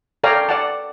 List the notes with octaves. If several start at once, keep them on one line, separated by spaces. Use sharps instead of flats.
A4 C#5 D5 F5 G5 A#5
D5 F#5 A5